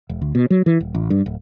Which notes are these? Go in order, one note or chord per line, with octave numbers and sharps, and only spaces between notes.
E1
D2
B2
F#3
E3
D#1
A1
G2
D1